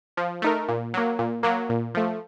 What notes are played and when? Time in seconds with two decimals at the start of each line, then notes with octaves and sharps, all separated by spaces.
0.17 F3
0.42 A3 D#4 A#4
0.69 A#2
0.94 F#3 A#3
1.19 A#2
1.43 F#3 A#3
1.69 A#2
1.95 F3 A3